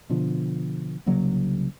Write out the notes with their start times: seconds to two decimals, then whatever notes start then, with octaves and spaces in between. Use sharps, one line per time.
0.10 B2 D3 F3
1.06 C2 C#3 F#3 A#3